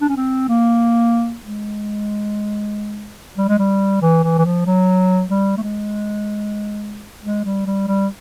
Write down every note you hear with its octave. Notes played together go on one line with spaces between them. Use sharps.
D4
C#4
C4
A#3
G#3
G3
G#3
G3
E3
E3
E3
F3
F#3
G3
A3
G#3
G#3
G3
G3
G3